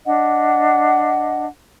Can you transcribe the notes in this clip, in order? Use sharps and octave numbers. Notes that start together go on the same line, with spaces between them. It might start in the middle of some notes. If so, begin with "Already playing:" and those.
D4 D#5 F#5